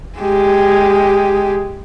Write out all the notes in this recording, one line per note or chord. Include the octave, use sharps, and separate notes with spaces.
G#3 G4